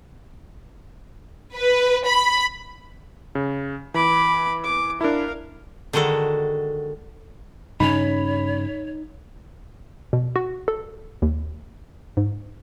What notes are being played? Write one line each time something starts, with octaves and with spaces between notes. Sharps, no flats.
B4
B5
C#3
E3 B5 D6
D6
D4 E4 A#4 F5
D3 D#3 G#3 F#4 A4
G2 C#3 C#4 D#4 C#5 B5
B2
F#4
A4
D#2
G#2